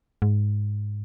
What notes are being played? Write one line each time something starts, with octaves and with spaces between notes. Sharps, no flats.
G#2